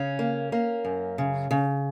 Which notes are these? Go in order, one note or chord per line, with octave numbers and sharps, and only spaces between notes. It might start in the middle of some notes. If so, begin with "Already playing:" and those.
Already playing: C#3 C#4
A#3
A#3
F#2
C#3
C#3